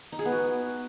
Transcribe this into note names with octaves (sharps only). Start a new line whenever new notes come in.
D#4
G#4
B3
F#4